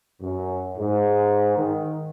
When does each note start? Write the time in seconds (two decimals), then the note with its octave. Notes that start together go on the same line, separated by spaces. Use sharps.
0.22 F#2
0.78 G#2
1.57 D#3